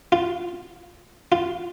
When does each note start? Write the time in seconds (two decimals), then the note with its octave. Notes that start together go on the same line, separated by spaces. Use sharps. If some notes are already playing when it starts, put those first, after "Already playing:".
0.12 F4
1.32 F4